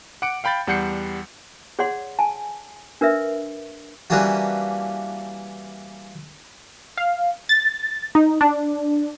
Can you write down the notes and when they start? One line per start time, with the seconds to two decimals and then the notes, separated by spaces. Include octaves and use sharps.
0.22 F#5 D6 C#7 D7
0.44 F5 G5 B5 G6 A6
0.67 E2 G3 F#5 G6 C7 C#7
1.79 G#4 C#5 D5 F#5 C6
2.19 G#5 A5
3.01 D4 A#4 B4 E5
4.10 E3 G3 A#3 C#4 D4 F#4
6.97 F5
7.49 A6
8.15 D#4
8.41 D4